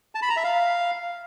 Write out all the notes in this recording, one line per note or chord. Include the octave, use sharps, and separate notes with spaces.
A5
B5
A#5
E5
F5